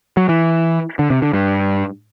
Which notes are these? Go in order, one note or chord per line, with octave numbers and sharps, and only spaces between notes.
F#3
E3
D3
C3
D3
G2